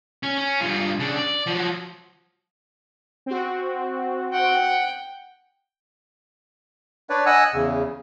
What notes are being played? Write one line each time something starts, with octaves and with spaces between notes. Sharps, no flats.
C#4
C#4
G2 F4
C#3 D4
D5
F3 F#3
C4 F#4
F#5 G5
D4 B4 C#5 D5
D#5 F#5 G#5 E6 F#6
E2 C#3